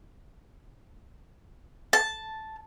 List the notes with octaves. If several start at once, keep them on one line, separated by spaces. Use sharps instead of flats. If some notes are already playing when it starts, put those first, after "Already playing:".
A5